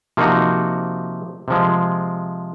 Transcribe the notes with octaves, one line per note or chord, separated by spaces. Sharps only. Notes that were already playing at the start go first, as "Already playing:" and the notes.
C3 F3 A#3 D#4 F#4
C3 F3 G#3